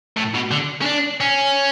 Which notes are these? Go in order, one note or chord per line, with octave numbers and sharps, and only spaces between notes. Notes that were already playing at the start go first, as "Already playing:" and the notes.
A2
B2
D3
C#4
D4
C#4